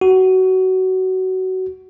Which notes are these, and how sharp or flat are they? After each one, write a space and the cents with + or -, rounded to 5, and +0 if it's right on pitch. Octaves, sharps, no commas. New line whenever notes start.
F#4 +20